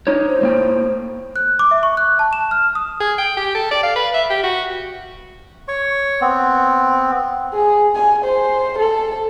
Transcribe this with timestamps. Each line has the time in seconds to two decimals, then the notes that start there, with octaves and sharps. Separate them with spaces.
0.07 D4 D#4 C#5
0.26 C5
0.41 A2 A#3 G5
1.36 F#6
1.59 D6
1.71 E5
1.83 C#6
1.97 F#6
2.19 A5
2.33 E7
2.51 F6
2.75 D#6
3.00 G#4
3.18 G5
3.37 G4
3.55 A4
3.71 D5
3.83 F5
3.96 B4
4.14 E5
4.30 G4
4.43 F#4
5.68 C#5 C#6
6.21 B3 C4
7.54 G#4
7.96 G#5
8.25 C5
8.78 A4